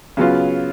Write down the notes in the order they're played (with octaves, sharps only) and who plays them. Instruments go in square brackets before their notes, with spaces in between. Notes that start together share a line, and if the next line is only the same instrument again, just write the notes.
[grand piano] C#3 F#3 B3 F4